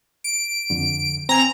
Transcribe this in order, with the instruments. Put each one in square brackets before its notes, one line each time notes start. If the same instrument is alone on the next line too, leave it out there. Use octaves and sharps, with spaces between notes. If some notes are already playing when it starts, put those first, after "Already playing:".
[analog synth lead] D7
[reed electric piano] F2 D3
[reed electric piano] C4 G#5 [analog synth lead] A#5